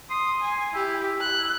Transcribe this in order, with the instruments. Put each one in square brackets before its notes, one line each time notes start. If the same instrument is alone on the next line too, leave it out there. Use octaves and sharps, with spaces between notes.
[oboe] C6 [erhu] D#6
[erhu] G#5
[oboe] E4 [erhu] G4
[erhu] F#6